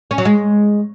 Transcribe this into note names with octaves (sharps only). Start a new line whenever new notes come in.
C#4
F#3
G#3